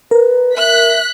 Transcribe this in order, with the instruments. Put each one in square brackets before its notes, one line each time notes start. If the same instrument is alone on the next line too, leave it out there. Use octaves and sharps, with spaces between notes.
[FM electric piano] A#4 [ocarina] B4
[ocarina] E5 [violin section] F#6 B6